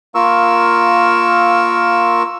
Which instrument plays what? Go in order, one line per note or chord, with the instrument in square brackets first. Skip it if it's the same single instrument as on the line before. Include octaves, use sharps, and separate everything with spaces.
[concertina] A#3 F4 A#4 C#6 E6